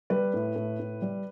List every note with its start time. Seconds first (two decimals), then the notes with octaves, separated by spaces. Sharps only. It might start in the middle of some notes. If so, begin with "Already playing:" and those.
0.10 G3 B4
0.33 A2
0.55 A2
0.79 A2
1.02 G3